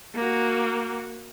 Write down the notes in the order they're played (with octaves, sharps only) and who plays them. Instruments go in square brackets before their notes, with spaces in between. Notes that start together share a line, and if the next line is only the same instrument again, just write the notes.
[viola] A#3 F#4